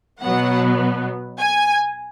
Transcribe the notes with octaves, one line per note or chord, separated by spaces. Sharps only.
B2 F#3 B3 F#5
G#5